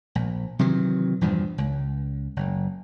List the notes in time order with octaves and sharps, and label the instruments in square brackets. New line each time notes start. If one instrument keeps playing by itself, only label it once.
[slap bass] A#1
C3 D#3 E3 F#3
E2 G2 A#2 F3
C#2
F#1